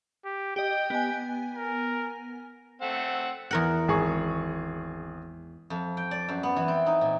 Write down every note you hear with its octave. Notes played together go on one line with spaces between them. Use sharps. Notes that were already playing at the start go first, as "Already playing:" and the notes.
G4
G4 D#5 G5
B3 G#5
A#4
A3 C4 F#5
E2 A#4 F#5
G#1 G#4 C#6
F2
G5
D5
F#2
B3
E3
C4
D#4
A#2